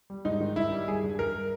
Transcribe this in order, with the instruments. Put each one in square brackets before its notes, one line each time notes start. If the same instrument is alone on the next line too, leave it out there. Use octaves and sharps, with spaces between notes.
[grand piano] G3
G#2 D#4
D#3
G2 E4
G3
G3 G#4
G2
G2 A#4